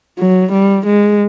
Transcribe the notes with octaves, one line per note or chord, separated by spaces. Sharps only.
F#3
G3
G#3